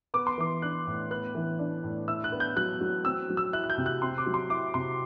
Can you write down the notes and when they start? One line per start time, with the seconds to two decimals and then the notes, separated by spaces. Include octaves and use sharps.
0.14 B3 D6
0.27 C6
0.38 E3 D6
0.62 D4 F#6
0.87 A2
1.11 B3 F#6
1.35 E3
1.59 D4
1.84 A2
2.08 E4 E6
2.24 F#6
2.32 B3
2.40 G6
2.56 F#3 F#6
2.81 F#3
3.05 C4 E6
3.30 F#3
3.37 E6
3.53 E4 F#6
3.64 F#6
3.70 G6
3.78 C3
3.86 F#6
4.02 C4 C6
4.18 D6
4.26 F#3
4.34 C6
4.50 E4 D6
4.74 C3 C6